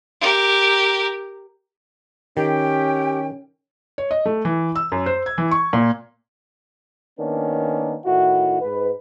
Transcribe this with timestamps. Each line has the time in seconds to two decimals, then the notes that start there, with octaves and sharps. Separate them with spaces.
0.21 G4 A#4
2.37 D#3 C#4 G4 G5
3.98 C#5
4.11 D#5
4.26 A3
4.45 E3
4.75 E6
4.92 F#2
5.06 C5
5.26 G#6
5.38 E3
5.51 C#6
5.73 A#2
7.19 D#3 A#3 B3 C#4 D4
8.06 A2 D#3 E4 F#4
8.61 G#2 B4